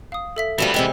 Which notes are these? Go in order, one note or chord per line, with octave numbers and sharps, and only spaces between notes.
F5 D#6
A4 E5 B6
D2 E3 F3 G3 B3
C3 G3 G#3 G5